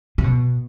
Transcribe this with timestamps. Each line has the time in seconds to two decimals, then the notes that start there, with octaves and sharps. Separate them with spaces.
0.18 C#3
0.24 B2